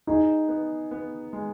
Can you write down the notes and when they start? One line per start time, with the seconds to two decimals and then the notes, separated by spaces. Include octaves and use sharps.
0.07 D#4 G#4
0.49 B3
0.91 B3
1.33 G#3